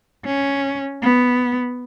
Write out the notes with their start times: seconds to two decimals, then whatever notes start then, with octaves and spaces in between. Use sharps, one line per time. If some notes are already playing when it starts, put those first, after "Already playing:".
0.25 C#4
1.02 B3